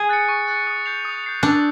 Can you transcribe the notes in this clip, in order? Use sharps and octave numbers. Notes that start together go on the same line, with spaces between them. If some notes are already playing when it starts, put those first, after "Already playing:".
Already playing: G#4
F#6 A6 C#7
C#6
F#6 A6 C#7
D#6
G6 C7 F7
D#6
G6 C7 F7
D4 E6